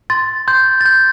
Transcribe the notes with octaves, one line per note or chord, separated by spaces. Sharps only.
C6 A6
C6 G6
A6
C6 G6